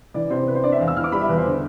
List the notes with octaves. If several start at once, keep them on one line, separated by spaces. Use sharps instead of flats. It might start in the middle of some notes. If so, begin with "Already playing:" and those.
E3 D5
C3 C5
C3 B4
C5
D4 D5
E5
E2 F5
E6
E3 F6
D6
G3 B5
E5
E2 B4
C5
D3